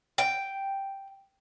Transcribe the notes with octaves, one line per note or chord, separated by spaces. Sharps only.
G5